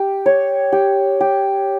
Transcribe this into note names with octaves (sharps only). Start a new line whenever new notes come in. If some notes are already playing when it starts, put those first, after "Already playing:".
Already playing: G4
C#5
G4
G4